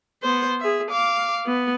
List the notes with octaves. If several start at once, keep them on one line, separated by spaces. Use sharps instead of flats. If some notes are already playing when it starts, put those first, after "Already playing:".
B3 C5
G#4 E5
F5 D6
B3